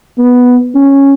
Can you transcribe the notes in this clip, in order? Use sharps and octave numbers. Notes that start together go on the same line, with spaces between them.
B3
C#4